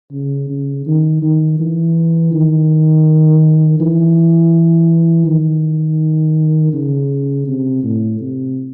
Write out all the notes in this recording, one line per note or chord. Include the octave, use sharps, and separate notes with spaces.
C#3
C#3
D#3
D#3
E3
D#3
E3
D#3
C#3
C3
A2
C3